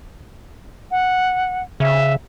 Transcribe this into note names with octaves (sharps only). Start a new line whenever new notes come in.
F#5
C#3 E5